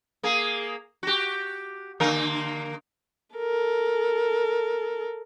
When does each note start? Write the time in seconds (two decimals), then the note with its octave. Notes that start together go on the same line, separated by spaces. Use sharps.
0.23 A#3 G#4
1.03 F#4 G4
2.00 D3 A#3 A#4
3.36 A4 A#4